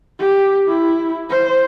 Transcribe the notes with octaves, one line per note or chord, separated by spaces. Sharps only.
G4
E4
C5